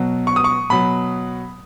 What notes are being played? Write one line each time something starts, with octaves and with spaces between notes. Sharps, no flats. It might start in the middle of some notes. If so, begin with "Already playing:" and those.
Already playing: B2 F#3
C#6
D#6
C#6
B2 F#3 B5